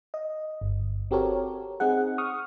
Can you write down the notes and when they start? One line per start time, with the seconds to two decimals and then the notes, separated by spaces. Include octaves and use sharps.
0.14 D#5
0.61 G1
1.11 C4 F#4 G4 A4 A#4 C#5
1.80 C4 D#4 G#4 F#5
2.18 C#6 D#6 F6